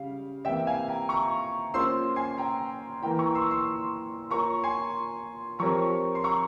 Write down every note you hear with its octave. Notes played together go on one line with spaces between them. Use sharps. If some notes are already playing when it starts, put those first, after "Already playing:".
Already playing: C#3 G3 F5
C3 E3 A#3 E5 G5
F5 G#5
G5 A#5
A#5 C#6
A#3 C#4 F4 C5 C6 E6
G#5 C6
G5 A#5
E3 A#3 E4 G5 A#5
A#5 C#6
C6 E6
C6 E6
A#3 F4 A#4 C#5 A#5 C#6
G#5 C6
F3 C4 G4 A#4 C#5 A#5 C#6
C6
A#5 C#6